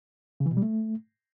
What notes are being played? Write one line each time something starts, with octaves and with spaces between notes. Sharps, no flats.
C#3
E3
B2
G3
A3